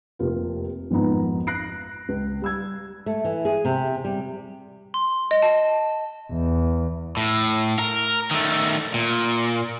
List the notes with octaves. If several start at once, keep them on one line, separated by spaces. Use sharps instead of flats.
F1 C3 A#3 F4
G#1 F2 G#2 B3 D#4 A#5
F#6 A#6 C7 D7
C#2
G3 E6 G#6
A3
E3
G#4
C3
G3
C6
D#5
A5
E2
A2
A#4
D#3 A3
A#2